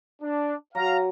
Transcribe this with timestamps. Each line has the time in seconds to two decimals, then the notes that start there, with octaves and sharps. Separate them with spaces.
0.22 D4
0.75 F#3 F5 A#5